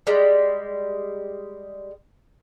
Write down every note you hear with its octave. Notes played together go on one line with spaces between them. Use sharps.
G3 G#3